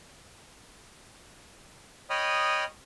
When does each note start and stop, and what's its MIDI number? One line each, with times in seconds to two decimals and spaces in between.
2.10 2.64 73
2.10 2.64 75
2.10 2.64 79
2.10 2.64 83
2.10 2.64 87
2.10 2.64 89